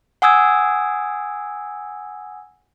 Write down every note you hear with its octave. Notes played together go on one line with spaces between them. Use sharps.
F#5 G#5 D#6 E6 G#6